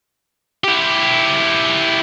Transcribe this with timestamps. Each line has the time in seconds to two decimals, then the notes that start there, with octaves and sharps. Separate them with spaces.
0.64 E4 G4